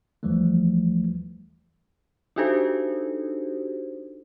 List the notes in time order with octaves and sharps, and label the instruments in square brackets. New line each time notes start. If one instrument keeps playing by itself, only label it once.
[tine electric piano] D#2 E3 F3 G3 A3
[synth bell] D4 D#4 F#4 G4 A4 C5